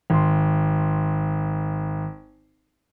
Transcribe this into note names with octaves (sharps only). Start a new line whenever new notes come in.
G#1 C6